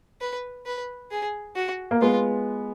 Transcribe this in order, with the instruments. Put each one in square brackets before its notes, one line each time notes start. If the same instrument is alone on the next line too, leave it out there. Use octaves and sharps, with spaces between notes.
[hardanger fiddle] B4
B4
G#4
F#4
[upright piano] A#3
[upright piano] G#3 B3 [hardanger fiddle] F4